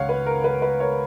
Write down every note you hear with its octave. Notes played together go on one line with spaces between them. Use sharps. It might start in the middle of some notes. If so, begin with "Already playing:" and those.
Already playing: C#2 C#3 G#3 C#5 F5 F#5
B4
A#4
B4
B4
A#4 C#5